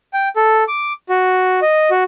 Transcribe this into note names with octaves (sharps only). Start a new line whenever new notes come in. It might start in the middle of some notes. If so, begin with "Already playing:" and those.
G5
A4
D6
F#4
D#5
F#4